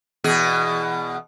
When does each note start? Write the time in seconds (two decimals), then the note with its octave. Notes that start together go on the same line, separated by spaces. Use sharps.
0.24 E2 B2 G#4